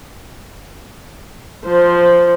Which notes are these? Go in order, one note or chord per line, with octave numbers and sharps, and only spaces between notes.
F3 C5